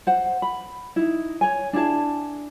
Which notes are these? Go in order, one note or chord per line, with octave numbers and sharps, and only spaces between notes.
C5 F#5
B5
D#4 E4
C#5 G#5
D4 E4 G#4 A5